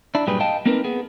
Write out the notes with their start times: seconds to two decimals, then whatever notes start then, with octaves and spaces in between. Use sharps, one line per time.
0.15 D4 E4
0.27 G2 A#2 F#3 G4 G#4 B4
0.40 D#5 F5 G5 A5
0.66 A#3 C4 D#4 A#4 B4
0.84 B3 G#4